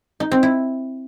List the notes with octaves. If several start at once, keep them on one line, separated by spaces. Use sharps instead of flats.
D#4
C4
E4